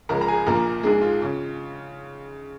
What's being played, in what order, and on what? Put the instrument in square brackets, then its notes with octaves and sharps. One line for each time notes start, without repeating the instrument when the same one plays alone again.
[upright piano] C#2 C#3 F3 A#4 A#5
A#5
G#4 G#5
A#1 A#2 F3 A#3 A#4 A#5
A#1 G#2 G#3 G#4
F4
C#3